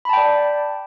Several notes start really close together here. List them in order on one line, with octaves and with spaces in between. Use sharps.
B5 A5 G5 D5